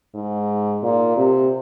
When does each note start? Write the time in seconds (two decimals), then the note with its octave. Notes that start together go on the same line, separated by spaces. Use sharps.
0.15 G#2
0.83 A#2
1.17 C3